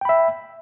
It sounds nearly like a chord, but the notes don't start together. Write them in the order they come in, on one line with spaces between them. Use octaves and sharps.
G5 B5 E5